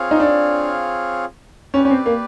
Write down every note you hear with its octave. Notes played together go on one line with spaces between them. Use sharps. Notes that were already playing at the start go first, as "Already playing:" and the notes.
Already playing: C4 F4 G#4 C#5 F5
D#4
D4
C#4 G4 B4 D5
C#4
C4
A#3